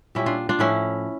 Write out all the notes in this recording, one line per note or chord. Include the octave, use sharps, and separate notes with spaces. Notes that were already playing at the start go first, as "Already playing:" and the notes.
A#2 G3 C#4 E4
D4 F4
D4 F4
A2 F3 C#4 E4